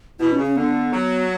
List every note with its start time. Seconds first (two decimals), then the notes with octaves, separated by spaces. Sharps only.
0.19 B2 E4
0.32 C#4
0.38 C#3
0.43 C#4
0.56 D3 B3
0.93 F#3